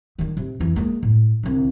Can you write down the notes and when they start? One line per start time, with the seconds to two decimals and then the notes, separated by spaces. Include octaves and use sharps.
0.19 D#3 G3
0.37 C3
0.60 F2 E3
0.76 G#3 A#3
1.03 A2
1.43 C2 D3